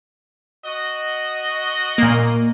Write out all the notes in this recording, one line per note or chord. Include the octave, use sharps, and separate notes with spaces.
F#4 D#5
A#2 A#3